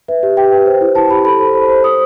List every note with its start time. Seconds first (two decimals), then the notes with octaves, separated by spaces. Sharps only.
0.08 B4 E5
0.23 G4
0.37 G4 G5
0.52 B4
0.66 C5
0.81 E4
0.95 E4 A5
1.10 G4 B5
1.25 A4 B5
1.40 C5
1.54 C5
1.69 C5
1.84 C5 D#6